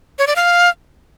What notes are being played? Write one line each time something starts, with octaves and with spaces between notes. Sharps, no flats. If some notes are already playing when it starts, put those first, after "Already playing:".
C#5
D5
F5